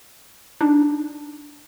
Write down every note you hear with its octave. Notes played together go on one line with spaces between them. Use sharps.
D4 D#4